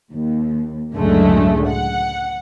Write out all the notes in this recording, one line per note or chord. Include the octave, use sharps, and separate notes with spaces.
D#2
C#2 F#2 A2 D3 G#3 A3
F#5